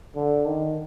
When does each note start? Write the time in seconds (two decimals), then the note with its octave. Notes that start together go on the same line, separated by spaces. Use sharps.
0.16 D3
0.45 D#3